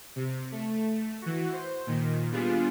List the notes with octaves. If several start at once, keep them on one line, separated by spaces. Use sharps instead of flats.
C3
A3
E3 F#4
C5
A#2 D#3
G3 B3 D4 F4 G#4